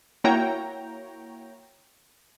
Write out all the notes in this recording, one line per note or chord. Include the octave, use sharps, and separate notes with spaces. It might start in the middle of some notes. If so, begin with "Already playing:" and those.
A#3 E4 F#4 C#5 G5 A#5